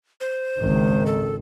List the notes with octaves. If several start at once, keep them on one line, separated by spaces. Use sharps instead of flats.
C5
G#1 C#2 D#3
A4